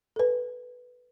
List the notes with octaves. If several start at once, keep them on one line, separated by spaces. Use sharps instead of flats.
A4 B4